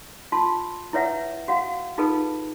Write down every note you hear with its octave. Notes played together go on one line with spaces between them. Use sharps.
F4 A5 C6
E4 B4 C#5 E5 F#5
F#4 F5 F#5
D#4 F4 G#4 A4 B4